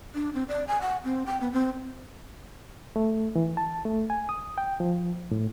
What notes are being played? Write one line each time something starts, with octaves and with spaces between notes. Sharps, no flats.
D4
C4
D5
G#5
F#5
C4
G5
B3
C4
A3
E3
A5
A3
G#5
D#6
G5
F3
A2